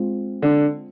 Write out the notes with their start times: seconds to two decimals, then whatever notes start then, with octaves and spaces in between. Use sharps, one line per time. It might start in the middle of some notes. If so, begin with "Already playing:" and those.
Already playing: G#3 C4 F4
0.42 D3